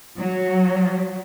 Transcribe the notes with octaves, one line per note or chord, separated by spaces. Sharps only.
F#3